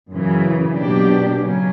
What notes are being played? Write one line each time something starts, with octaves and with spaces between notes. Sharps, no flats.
F#2 C#3 E3
B2 F#3 A#3 D4 G4
C#3 F#3 C#4